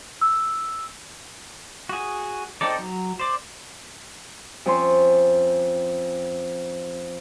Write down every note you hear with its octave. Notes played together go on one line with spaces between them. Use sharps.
E6
F#4 G#4
C4 D#4 A4 D5
F#3
C5 D5
F2 C#4 C6